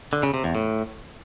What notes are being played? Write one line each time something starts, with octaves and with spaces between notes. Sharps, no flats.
D3
C#3
C3
E2
A2